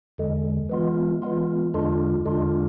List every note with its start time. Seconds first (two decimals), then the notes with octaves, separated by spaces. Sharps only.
0.18 E2 D3 G#3
0.69 E3 G#3 B3 F4
1.22 E3 G#3 B3 F4
1.74 E2 D3 G#3 D4 F4
2.25 E2 D3 G#3 D4 F4